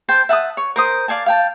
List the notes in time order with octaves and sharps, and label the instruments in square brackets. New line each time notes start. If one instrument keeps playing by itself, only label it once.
[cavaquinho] C5 G5 A5
E5 F#5 A5 D#6
C#5
A#4 C5 D#6
D5 F5 G#5 A5
F5 G5 A5